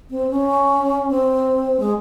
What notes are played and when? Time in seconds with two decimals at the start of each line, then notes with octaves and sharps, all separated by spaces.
0.10 C4
0.31 C#4
1.11 C4
1.80 G#3